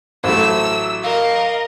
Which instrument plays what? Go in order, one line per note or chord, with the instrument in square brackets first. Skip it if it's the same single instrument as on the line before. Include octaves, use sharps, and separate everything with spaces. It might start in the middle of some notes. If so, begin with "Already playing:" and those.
[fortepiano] A1 A3 [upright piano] F#3 C5 [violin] E6
[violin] A#4 D#5 [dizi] F5